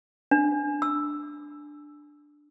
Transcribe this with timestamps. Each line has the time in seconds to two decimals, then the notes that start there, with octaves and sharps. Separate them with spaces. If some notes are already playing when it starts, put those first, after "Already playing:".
0.31 D4
0.82 E6